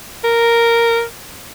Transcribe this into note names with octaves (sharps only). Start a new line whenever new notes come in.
A#4